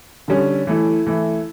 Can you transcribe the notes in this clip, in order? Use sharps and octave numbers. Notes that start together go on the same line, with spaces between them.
D3 G3 C#4
E3 A3 E4
E3 A3 E4